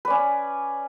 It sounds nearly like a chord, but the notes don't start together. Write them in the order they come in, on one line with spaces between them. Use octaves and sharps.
B4 D5 C#4